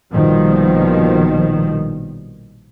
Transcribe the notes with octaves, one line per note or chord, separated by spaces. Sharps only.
A#1 B2 D#3 F3 G3